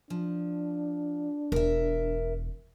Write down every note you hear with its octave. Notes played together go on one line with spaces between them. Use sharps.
F3 D4
E1 A#4 E5